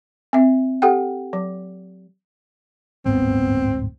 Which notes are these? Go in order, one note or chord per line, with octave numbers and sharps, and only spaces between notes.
C4 E5
G4 A4 F#5 G5
F#3
D1 G1 G#2 B3 C4